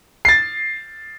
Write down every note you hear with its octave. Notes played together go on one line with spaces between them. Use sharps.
A6 C7